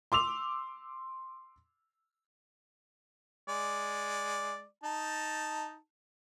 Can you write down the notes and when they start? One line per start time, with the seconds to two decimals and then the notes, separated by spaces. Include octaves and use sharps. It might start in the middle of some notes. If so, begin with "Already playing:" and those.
0.12 C6 D6 E6 F7
3.48 G#3 D5
4.84 D#4 A5